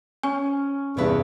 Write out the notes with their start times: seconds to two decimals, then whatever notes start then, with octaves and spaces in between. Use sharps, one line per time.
0.23 C#4 G#5
0.97 E2 G2 C3 B3 B4